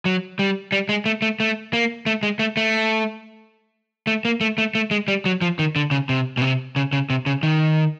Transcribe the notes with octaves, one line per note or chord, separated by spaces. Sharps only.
F#3
G3
G3
G#3
A3
A3
A3
A#3
A3
G#3
A3
A3
A3
A#3
A3
A3
A3
G#3
G3
F#3
F3
D#3
D3
C#3
C3
B2
C3
C#3
C#3
C3
C#3
D#3